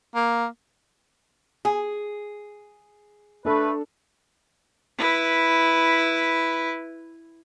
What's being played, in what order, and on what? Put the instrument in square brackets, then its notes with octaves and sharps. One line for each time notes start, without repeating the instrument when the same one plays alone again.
[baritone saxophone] A#3
[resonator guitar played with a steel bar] G#4
[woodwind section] A3 B4 [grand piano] D4 A4
[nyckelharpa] E4 B4